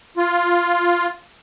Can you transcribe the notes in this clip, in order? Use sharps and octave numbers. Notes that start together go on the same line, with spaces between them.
F4